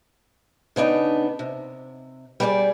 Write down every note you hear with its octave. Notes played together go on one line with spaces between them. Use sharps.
C#3 B3 D4 D#4
C3
G3 G4 G#4 C#5 D5